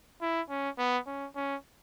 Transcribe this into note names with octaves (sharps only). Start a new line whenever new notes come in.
E4
C#4
B3
C#4
C#4